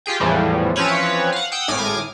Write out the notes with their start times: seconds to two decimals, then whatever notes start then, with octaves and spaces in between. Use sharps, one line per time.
0.06 F4 G4 G#4 G5
0.20 G#1 E2 A2 E3 F3 G3
0.76 E3 F3 C4 C#4 B4 C#5
1.32 F5 F#5
1.52 F#5 G5 D#6 E6
1.68 G#1 A2 G#5 D6 D#6 F6